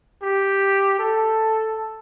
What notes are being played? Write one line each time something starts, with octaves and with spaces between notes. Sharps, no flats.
G4
A4